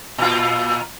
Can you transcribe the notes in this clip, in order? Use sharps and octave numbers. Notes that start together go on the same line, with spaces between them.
A#2 F4